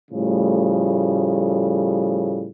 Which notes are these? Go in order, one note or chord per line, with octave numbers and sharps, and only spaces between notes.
A2 C#3 F3 G3 A3